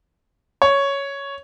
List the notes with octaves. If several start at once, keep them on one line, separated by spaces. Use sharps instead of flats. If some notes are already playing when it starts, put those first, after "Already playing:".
C#5